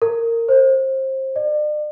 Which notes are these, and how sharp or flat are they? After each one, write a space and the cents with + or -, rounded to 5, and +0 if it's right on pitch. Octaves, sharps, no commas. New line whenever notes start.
A#4 -20
C5 +25
D5 +40